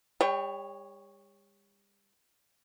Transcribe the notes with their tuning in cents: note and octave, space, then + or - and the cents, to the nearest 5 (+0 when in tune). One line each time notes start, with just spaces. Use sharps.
G3 +40 C#5 +0 G5 +0